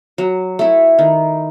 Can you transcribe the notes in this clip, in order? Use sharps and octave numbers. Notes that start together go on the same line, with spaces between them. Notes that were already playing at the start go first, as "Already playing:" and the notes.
F#3
A3 E4
D#3